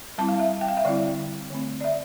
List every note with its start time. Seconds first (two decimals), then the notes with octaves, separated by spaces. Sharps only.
0.18 G3 C4 E4 A5
0.29 F5
0.40 E5
0.61 G5
0.68 F5
0.77 E5
0.85 D3 G3 C4 E4 D5
1.50 D3 A3 C4
1.81 D5
1.84 E5